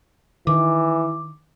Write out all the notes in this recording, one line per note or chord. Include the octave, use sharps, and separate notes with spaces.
D#3 E3 D6